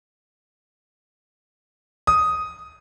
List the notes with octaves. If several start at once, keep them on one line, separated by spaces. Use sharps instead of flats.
D#6